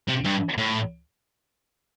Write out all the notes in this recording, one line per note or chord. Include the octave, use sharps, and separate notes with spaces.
C3
G2
A2